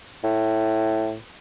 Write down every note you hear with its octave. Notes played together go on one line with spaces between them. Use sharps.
A2